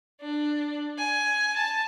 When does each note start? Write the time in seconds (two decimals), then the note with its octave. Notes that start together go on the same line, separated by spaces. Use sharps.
0.21 D4
0.98 G#5
1.57 A5